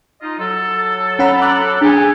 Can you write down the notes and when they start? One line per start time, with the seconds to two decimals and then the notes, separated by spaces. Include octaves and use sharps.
0.22 D#4 F4 D#5
0.39 F#3 A4
1.19 C#4 F#5 A#5 B5
1.42 D6 F#6
1.81 F#3 A3 D4 G4 G#4